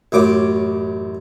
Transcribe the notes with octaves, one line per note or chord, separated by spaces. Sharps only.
A1 F#2 D6